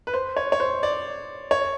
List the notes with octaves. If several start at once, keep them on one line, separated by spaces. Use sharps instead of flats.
B4
C5
C#5
C#5
C5
D5
C#5